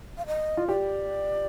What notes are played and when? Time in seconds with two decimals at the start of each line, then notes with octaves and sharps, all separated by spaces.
0.18 F5
0.26 D#5
0.57 F4
0.68 G4 D5